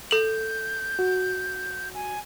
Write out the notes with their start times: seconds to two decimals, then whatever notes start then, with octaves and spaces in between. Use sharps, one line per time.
0.11 A4 G6 F#7
0.99 F#4
1.94 G#5